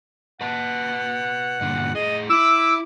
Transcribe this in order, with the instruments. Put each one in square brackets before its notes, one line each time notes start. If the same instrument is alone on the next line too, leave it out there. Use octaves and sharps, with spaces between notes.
[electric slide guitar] B4 D#5 A5 [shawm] F#5
[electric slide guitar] G2 A#2 D3
[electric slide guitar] A2 G#4 [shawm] D#5
[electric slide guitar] E4 E5 [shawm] D6 [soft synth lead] E6